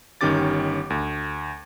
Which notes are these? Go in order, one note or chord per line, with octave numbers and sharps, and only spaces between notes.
G1 D#3 C#4 G4 D6 A6
D2